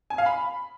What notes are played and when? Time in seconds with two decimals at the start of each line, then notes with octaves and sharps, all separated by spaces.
0.10 G#5
0.18 F5
0.26 B5